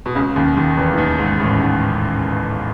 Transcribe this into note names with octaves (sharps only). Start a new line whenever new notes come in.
B2
C#2 C#3
D#2 D#3
D#2 D#3
E2 E3
E3
D#2 D#3
G#2
A1 A2
G#2